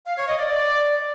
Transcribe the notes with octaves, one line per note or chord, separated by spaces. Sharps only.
F5
C#5
D#5
D5
D5